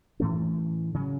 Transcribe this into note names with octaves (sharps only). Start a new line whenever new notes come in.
A2 E3 A3 C#4
C#3 F#3 C#4